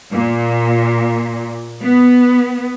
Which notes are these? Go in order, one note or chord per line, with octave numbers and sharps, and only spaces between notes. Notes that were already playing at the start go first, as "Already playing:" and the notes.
A#2
B3